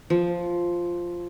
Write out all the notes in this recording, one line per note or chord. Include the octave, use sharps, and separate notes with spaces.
F3